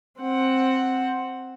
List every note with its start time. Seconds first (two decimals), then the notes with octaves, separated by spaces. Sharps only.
0.20 C4 F#5